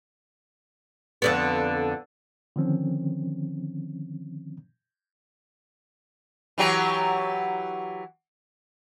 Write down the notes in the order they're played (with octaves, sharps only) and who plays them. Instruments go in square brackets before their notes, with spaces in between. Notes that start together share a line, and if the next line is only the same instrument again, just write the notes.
[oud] F2 D3 B3
[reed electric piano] D3 D#3 F3 C4 C#4
[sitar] E3 F#3 G4